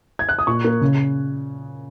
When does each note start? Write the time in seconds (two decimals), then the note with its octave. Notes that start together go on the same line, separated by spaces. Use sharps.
0.19 G#6
0.29 F#6
0.39 D#6
0.47 A#2 C#6
0.64 A#3
0.81 C#3